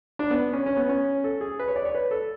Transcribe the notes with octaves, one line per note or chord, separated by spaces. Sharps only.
D4
B3
C#4
C#4
B3
C#4
A4
G#4
B4
C#5
D5
C#5
B4
A4